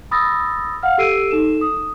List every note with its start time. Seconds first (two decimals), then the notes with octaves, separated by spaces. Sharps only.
0.11 B5 D#6 E6 A6 A#6
0.83 F5 F#5 F6
0.98 G4 A4 E6 C7 D7 D#7
1.31 D#4 A4 E7
1.61 D#6